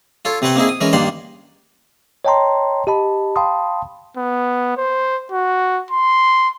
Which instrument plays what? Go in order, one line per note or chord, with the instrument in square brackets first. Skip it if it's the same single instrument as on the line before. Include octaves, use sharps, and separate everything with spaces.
[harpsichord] F4 A4 C#5
C3 C4 B4 C#5 F#5 G5
A#3 C4 D#4 E4 G#4
D#6
E3 G#3 C#4 A#4
G2 D#3 A#3 D5 F#5 C6
[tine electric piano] C#5 D#5 G5 A5 A#5 C6
G4 D#5 A5 B5
F5 G5 A5 B5 C6 D#6
[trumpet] B3
C5
F#4
C6